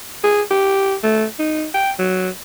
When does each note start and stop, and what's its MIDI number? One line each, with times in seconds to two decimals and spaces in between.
0.24 0.42 68
0.51 0.95 67
1.03 1.25 57
1.39 1.66 63
1.74 1.91 79
1.99 2.29 54